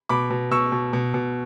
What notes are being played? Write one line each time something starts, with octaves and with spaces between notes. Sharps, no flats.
B2 B5 D6
B2
B2 C#6 E6
B2
B2
B2